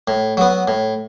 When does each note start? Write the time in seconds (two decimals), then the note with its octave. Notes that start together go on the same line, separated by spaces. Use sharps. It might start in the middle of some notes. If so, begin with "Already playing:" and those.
0.08 A2
0.37 F#3 B3
0.68 A2